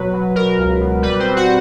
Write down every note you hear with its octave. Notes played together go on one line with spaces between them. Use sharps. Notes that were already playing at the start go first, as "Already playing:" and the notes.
Already playing: B2 F#3 B4
F#3
B2 A#4
C#2
B2
G3 B4
C4 C5
G3
F#4 F#5